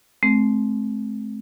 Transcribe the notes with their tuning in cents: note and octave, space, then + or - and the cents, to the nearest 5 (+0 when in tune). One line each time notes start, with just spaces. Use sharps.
A3 -40 C4 +0